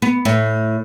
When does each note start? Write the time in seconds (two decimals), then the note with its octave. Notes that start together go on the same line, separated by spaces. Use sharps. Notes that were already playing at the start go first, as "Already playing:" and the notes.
0.02 B3
0.25 A2